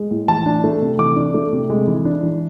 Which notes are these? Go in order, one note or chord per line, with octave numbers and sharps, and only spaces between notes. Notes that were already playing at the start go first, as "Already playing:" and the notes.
Already playing: G#3
A2
E3 A5
D4
A3
C3
E3 D6
D4
A3
C3
G#3
E3
D4
E3